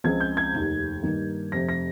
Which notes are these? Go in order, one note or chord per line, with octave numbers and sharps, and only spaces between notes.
C#2 C#3 F3 G#3 C4 G#6
G6
G#6
F1 D#2 D#3
G2 D#3 A#3
F1 F2 C3 A#6
A#6